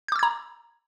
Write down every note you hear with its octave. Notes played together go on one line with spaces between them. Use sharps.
A#5 D6 E6 G6 G#6